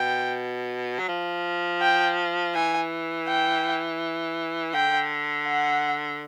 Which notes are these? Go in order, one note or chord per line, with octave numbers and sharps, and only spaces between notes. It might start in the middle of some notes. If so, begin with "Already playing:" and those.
Already playing: B2 G5
F#3
F3
G5
E3 G#5
G5
D3 G5
F#5